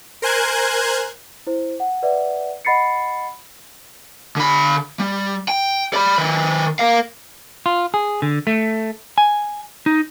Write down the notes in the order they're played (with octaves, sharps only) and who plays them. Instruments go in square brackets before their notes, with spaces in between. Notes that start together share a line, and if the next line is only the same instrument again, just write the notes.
[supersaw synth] A#4 C5 G#5 F#6 G#6
[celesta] E4 C5
F#5
B4 D5 E5 F#5
D#5 F#5 B5 A6 C7 C#7
[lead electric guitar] D3 B5
G3
G5
D5 B5
D#3 B4
A#4 F5
[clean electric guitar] F4
G#4
D3
A3
G#5
D#4